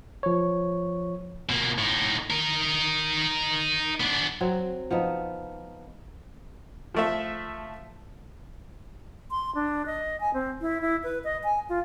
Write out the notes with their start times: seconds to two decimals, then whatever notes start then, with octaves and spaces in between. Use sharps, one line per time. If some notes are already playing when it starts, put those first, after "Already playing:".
0.23 F3 C#5
1.49 B2 A#3
1.78 A2 D#4
2.30 D#4 A#4
4.00 B3 D4
4.41 F#3 C4
4.91 F3 B3 D#4
6.94 F3 A3 E5
9.31 C6
9.55 D4
9.86 D#5
10.20 G#5
10.34 C4
10.61 E4
10.81 E4
11.04 B4
11.24 D#5
11.44 G#5
11.69 F4